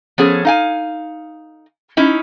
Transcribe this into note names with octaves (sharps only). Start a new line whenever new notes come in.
F3 B3 C#4 G#4 A4
D#4 F5 G#5
C#4 D#4 E4